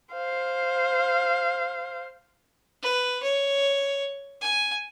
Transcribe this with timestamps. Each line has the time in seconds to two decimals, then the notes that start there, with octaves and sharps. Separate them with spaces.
0.13 C5 F5
2.82 B4
3.22 C#5
4.41 G#5